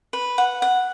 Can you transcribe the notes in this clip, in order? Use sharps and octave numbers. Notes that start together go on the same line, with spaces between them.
B4
F#5
F#5